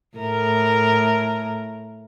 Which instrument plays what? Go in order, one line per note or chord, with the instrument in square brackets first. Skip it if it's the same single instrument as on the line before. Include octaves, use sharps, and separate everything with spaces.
[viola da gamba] A2 A#4